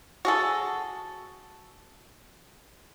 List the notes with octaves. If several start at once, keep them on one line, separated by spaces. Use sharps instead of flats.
F#4 G#4 A4